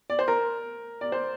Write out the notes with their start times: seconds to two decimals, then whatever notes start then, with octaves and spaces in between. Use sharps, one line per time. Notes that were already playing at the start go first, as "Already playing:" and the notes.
0.10 D5
0.19 C5
0.28 A#4
1.01 D5
1.12 C5